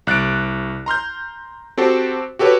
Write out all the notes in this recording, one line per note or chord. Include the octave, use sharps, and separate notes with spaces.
C2 F#6 A6 D7
A#5 C6 F6 G6
C4 F#4 G4 A4 C5 A5
F#4 G4 A4 B4 C#5